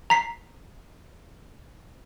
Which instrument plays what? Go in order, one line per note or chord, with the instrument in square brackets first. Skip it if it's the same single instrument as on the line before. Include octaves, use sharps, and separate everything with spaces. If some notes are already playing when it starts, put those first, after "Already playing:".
[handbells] A#5 B6 C7